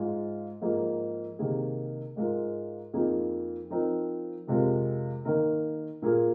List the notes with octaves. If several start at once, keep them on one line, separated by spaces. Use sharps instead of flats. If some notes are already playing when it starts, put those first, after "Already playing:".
Already playing: G#2 G#3 F4 G#4
G#2 F3 A#3 G#4
C3 D#3 A#3 G#4
G#2 G#3 F4 A#4
F2 F3 A#3 D#4 G#4
F3 C4 D#4 A#4
F2 C3 G#3 F4 A#4
D#3 A#3 D#4 A#4
A#2 A#3 F4 G#4